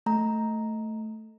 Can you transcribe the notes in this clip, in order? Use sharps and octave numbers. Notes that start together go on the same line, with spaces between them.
A3 A#5